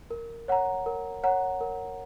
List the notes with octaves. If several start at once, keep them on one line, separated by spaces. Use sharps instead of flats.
A#4
C#5 F#5 A#5
A#4
C#5 F#5 A#5
A#4